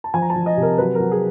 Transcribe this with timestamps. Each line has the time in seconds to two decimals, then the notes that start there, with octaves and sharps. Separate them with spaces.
0.04 A5
0.14 F3 G#5
0.22 A#5
0.30 A5
0.36 F3
0.46 D#5
0.57 C3
0.62 A#4
0.78 F#3 B4
0.95 A#4
1.00 F#3
1.12 G#4